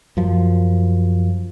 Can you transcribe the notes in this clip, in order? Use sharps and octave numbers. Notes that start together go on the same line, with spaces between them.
F#2 F3